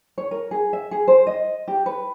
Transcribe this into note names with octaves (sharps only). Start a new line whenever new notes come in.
C#5
A#4
G#4
E5
G#4
C5
D#5
G4
B4